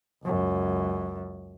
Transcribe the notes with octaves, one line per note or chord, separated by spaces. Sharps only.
C#2 F#2